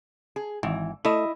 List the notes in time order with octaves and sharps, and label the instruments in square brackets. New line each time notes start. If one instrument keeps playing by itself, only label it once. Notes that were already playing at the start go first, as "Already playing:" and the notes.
[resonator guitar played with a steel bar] G#4
[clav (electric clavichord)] G#1 [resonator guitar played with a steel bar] E3
[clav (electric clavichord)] A3 [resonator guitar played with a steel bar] E4 D#5